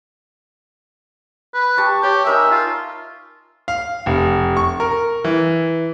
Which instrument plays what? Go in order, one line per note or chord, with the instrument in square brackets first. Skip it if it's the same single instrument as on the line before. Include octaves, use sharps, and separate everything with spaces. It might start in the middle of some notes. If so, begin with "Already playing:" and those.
[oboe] B4
[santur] G4 A5 C#6
[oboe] G4 [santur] C#5
[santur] D#4 A#4 G#5 [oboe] E5
[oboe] F4
[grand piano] F5
F1
C#6
A#4
E3